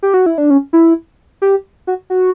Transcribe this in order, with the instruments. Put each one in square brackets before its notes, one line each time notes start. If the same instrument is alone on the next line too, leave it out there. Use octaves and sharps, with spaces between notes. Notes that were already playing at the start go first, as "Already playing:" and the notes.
[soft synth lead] G4
F#4
E4
D4
C#4
E4
G4
F#4
F#4